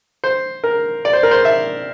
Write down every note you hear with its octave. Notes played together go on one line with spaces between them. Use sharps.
C5
A#4
D5
C5
A#4
C5
E5